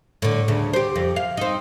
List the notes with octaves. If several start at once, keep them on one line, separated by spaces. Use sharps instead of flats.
A2 D3
D2 C#3
G4 C5
F2
F5
C4 D#4